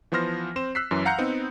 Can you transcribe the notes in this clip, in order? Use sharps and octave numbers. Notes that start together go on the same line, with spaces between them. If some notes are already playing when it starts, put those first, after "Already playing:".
E3 F3 B3 C5 F6 A#6
C4 C5 E7
E6 F#6 B6 C7
F#2 E3 F#3
F5 F#5 A#5 G6 C#7
B3 C4 D#4